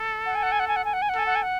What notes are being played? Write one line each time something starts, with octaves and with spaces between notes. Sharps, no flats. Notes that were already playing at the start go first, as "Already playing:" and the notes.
Already playing: A4
F#5
G#5
F#5
G#5
F#5
G#5
F#5
G#5
F#5
G#5
F#5
A4 G#5
F#5
G#5
F#5